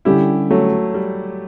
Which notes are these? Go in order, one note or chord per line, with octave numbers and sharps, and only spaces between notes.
D3 G3 C#4 E4 G4
F#3 A3
G3